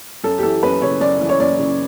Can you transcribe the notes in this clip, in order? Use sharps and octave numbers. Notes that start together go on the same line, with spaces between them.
F#2 A4
G4
E3 A4
F#2 B4
C#3 C#5
F#2 D5
E3
C#5
F#2 D5
C#3